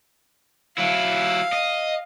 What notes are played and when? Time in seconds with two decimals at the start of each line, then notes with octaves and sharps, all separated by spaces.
0.78 F#3 E4 F5
1.53 D#5